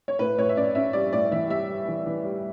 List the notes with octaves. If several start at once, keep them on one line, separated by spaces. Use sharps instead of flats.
C#5
A2 B4
A2 C#5
E5
C#4 D5
C#4 E5
G3 D5
A2 D5
E3 E5
G3 E5
G3
E3
E3
G3